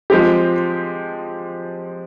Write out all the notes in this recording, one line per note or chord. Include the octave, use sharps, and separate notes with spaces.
F3 G#3 C4 G4